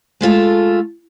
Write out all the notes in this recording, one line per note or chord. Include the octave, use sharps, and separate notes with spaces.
G#3 A3 F4 A4